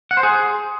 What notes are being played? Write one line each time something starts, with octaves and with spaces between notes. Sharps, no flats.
F#5
C5
G#4